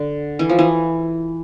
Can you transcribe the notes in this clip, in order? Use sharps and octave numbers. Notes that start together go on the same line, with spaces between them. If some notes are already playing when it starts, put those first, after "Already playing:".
Already playing: D3
E3
F3
E3